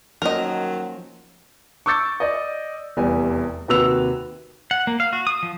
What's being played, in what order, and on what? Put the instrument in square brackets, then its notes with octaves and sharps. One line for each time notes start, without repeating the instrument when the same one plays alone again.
[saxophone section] D#3 F#3 [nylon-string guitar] F3 A#3 C#4 [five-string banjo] A#4 D#5
[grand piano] C#6 D6 E6 G6 A6 C#7
D5 D#5
F1 E2 G3 G#5
D#2 C3 F#4 B4 E6 F7
[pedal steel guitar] F#5
A#3
F5
F#4
D#6
F3